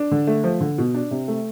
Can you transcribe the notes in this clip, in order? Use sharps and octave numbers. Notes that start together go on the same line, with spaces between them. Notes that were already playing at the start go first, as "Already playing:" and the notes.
Already playing: D4
D3
A3
F3
D3
B2
D4
C3
A3